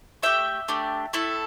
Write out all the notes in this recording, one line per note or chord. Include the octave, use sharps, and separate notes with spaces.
A3 D4 G4 E5 G5
A3 D4 G4
A3 E4 A4